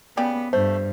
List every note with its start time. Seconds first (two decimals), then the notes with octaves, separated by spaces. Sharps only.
0.17 C#3 B3 G4 D5
0.53 G2 A3 C5